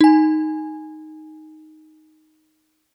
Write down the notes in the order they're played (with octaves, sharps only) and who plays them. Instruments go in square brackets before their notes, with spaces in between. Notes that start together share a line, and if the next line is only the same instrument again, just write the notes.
[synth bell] D#4 G#5